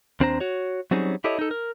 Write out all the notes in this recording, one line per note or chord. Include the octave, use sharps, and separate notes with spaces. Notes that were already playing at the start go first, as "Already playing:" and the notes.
D#2 C4 D4 C5 A#5
F#4 C#5
F#3 G3 C4 C#4 D#4 G#4
E4 G4 A4 C#5 D#5
D#4 A4
A#4